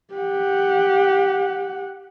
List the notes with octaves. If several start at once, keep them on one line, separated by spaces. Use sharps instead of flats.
G4 F#5